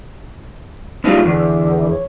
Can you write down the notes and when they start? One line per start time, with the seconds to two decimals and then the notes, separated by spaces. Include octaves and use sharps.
1.04 G3 B3 D#4 F4
1.25 E2 D3
1.90 C#5